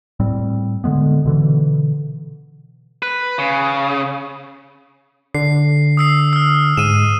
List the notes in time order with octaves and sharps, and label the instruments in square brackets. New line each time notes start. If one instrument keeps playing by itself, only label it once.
[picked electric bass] A2 G3 C4
D3 D#3 G#3 B3
B2 D3 E3
[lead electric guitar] B4
C#3
[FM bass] D3 [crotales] C7
[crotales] D#6 E6 C7
E6 F6
[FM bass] G#2 [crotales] D#7 E7